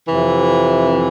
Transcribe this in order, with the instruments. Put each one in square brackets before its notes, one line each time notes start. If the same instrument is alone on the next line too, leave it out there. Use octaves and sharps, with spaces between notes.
[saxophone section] F2 C3 E3